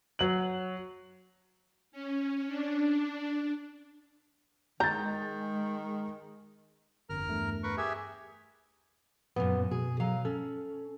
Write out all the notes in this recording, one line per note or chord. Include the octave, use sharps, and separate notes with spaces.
F#3 F#7
C#4
D4
D#3 G#3 A#5 G6 A6
G1 F2 A#4 F6
E2 G2 A3
A#4 B4 C#6
G4 G#4 E5
F#2 A#2 B3
B2 G#4
F#3 F5 A#5
C#4 A4